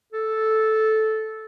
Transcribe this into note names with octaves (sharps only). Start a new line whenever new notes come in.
A4